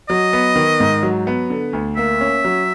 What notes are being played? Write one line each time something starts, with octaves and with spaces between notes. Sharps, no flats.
F#3 D#5
B3
D#3
G#2
F#3
B3
D3
D2
A#3 E5
C#4
F#3